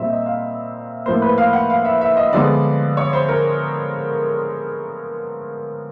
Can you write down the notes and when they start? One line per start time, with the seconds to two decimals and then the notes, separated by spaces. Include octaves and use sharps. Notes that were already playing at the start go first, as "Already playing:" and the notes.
Already playing: A#2 G3 C4 E5
0.10 D#5
0.26 F5
1.06 A2 F3 A#3 C5
1.22 B4
1.38 F5
1.53 F#5
1.70 F5
1.85 E5
2.01 E5
2.17 D#5
2.33 D3 F3 G#3 B3 D5
2.97 C#5
3.13 C5
3.29 A#4